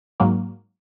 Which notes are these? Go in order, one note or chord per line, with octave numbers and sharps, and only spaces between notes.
G#2 F#3 A#3